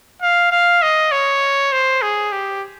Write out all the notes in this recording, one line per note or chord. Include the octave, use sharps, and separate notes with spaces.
F5
F5
D#5
C#5
C5
G#4
G4